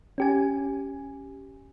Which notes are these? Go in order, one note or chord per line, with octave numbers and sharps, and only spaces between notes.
C#4 G4 G#5